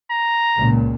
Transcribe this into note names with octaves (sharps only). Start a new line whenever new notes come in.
A#5
C#2 A#2